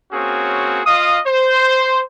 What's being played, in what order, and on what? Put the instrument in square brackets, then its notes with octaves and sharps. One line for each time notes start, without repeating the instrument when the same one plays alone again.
[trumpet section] A#3 C4 C#4 F#4 G#4 C#5
F4 D#5 F5 D#6
C5